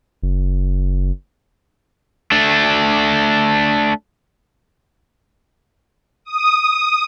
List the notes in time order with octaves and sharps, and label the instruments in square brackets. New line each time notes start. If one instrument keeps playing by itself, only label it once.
[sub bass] F#1
[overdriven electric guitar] A3 D4
[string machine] D#6